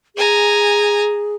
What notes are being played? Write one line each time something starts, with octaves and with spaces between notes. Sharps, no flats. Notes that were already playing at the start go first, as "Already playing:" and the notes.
G#4 G#5 A#5